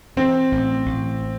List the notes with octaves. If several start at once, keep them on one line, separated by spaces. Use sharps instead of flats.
E3 C4
A1
A1